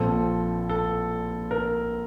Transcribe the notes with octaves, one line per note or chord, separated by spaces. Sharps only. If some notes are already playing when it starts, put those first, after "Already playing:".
Already playing: A#1 A#2 F3 C4 A4
A4
A#4